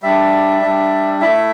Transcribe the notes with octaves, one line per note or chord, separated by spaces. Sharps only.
G3 D4 E5
G3 D4
A3 E4 E5